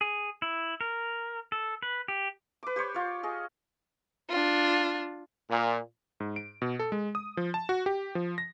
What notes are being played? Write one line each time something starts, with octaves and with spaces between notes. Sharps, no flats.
G#4
E4
A#4
A4
B4
G4
B4 D6
G4 C5 C#5
F4 C#5
G#4 D#5
D4 F4
A#2
G#2
D7
B2
A4
G#3
D#6
F3
A5
F#4
G4
F3
A#6